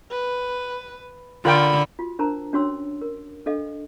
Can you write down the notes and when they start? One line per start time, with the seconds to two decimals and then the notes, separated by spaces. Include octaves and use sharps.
0.11 B4
1.45 D3 F4 A#4 G5 B5
1.99 F4 F#4
2.19 D4 A#4 C5 A5 A#5
2.53 C#4 D4 F#4 C#5 C6 E6
3.02 A#4
3.46 D4 A4 D#5 F5